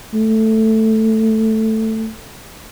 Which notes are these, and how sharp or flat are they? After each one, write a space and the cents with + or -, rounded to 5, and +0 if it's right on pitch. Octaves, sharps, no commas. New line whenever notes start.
A3 +5